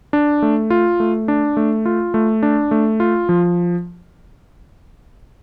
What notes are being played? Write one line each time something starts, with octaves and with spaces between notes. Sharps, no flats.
D4
A3
F4
A3
D4
A3
F4
A3
D4
A3
F4
F3